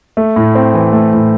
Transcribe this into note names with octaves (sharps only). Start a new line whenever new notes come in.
A3
A2
C4
E3
A3
A2